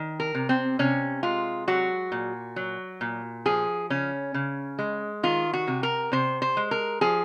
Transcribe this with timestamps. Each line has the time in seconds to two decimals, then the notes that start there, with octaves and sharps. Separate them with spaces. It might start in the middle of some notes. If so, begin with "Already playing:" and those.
Already playing: D#3
0.20 A#4
0.35 C3
0.49 C4
0.79 C3 C#4
1.23 G#3 F4
1.68 F#3 F#4
2.12 A#2
2.56 F#3
3.01 A#2
3.45 F3 G#4
3.90 C#3 C#4
4.34 C#3
4.79 G#3
5.23 D#3 F4
5.53 F#4
5.67 C3
5.83 A#4
6.12 C3 C5
6.42 C5
6.57 G#3
6.71 A#4
7.01 F3 G#4